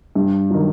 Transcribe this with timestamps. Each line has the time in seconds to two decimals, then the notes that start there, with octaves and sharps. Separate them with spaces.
0.15 G2
0.50 D#3 F#3